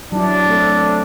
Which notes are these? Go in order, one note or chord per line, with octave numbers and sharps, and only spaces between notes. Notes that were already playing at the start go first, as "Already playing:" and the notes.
F#3 D4 E4
A3 C4 A4